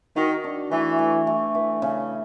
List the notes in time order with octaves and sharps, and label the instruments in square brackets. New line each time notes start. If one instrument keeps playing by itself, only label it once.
[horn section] D#3 [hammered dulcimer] F#4
[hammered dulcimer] D4
[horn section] E3 [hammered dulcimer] A3
[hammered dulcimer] A3
A3
E3
C#3